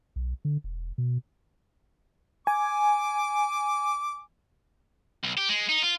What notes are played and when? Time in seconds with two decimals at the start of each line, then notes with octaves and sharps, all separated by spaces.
0.16 B1
0.45 D3
0.64 E1
0.98 B2
2.47 G#5 D6
5.24 B1
5.38 G4
5.49 G#3
5.69 D#4
5.83 F4